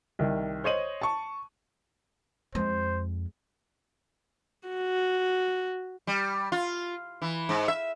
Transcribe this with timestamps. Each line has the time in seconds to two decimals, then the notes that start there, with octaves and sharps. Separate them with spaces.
0.19 C2 D#3
0.64 C5 C#5 D#5 D#7 F#7
1.02 A5 C#6
2.55 F2 G#3 C5
4.68 F#4
6.07 G3
6.52 F4
7.22 E3
7.49 G#2
7.68 E5